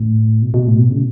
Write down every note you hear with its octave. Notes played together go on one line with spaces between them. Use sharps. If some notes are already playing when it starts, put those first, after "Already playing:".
Already playing: A2
B2
B2
A2
B2
C#3